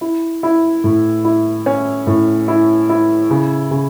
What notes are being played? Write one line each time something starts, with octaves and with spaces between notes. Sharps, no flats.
E4
E4
A2
E4
C#4
A2
E4
E4
C#3
C#3